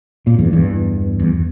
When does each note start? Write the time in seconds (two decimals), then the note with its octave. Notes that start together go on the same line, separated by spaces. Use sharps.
0.27 A#2
0.39 E2 G2
0.53 E2 G2
1.20 E2